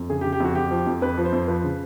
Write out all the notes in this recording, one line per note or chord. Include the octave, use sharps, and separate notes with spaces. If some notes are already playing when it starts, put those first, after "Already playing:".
Already playing: F2
C#3 G#4
G4
C#3
G4
F2 F#4
F2 G4
F3
F2
F2 B4
F3
C5
F2
F3 B4
C#3